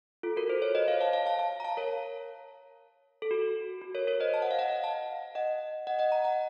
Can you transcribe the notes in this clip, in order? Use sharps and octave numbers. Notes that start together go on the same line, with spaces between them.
F4 A4
F#4 A#4
A4 C5
A#4 C#5
C5 D#5
C#5 F5
F5 A5
F5 A5
F5 A5
F5 A5
A#5
F5 A5
A#4 C#5
A4
F#4
F#4
A#4 C#5
A#4 C#5
C5 D#5
A5
F#5
F5
D#5 F#5
F5 A5
D#5 F#5
D#5 F#5
D#5 F#5
F#5 A#5
F#5 A#5